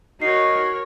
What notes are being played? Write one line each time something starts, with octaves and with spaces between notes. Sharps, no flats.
D#4 F#4 A#4 C#5 C7